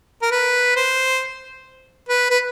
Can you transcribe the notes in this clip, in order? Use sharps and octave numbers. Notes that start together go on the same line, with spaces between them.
A#4
B4
C5
B4
B4